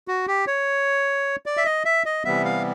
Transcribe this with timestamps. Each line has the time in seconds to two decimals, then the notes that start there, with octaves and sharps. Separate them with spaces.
0.08 F#4
0.27 G4
0.47 C#5
1.46 D5
1.57 E5
1.65 D#5
1.85 E5
2.06 D#5
2.25 C3 E3 G3 B3 E5
2.45 F5